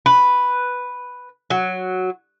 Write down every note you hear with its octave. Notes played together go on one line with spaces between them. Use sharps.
B4
F#3